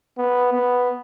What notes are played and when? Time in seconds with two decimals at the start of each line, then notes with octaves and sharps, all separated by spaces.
0.18 B3
0.53 B3